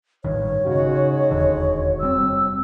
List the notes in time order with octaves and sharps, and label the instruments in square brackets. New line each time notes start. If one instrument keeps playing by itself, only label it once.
[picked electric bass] A1 G2 D#3 [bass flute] C#5
[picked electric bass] C#3 [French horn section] G#3 D#4 F#4
[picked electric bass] E1 D#2 D3
[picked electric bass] F1 G3 C4 [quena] E6